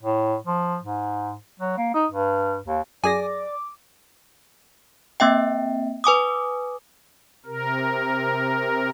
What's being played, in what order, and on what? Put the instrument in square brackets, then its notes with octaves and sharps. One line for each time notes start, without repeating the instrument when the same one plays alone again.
[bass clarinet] A2
F3
G#2
F#3
A#3
D#4
G2
D#2
[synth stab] F#2 G#4 A#6 [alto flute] D5 [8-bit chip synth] G#5 [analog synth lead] D6
[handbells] A#3 C4 E5 G5
B4 G#5 D6 D#6
[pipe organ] C3 A#4